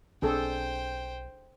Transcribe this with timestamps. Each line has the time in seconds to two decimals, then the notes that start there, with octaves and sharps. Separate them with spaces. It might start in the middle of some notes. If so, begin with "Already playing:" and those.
0.22 B1 F3 C4 D4 G#4 A4 C5 G5